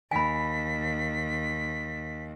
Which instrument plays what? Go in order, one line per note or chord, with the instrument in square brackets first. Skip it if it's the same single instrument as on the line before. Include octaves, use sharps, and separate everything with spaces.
[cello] D#2 [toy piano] G#5 B5 [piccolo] B6